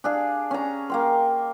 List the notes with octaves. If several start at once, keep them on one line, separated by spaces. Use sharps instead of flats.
D4 G#4 F5
C#4 A#5
A#3 G5 C6